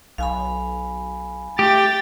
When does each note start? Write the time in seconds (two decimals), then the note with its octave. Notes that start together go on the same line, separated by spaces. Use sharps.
0.18 B1 F5 G#5 B5
1.59 A3 G4 G5 A6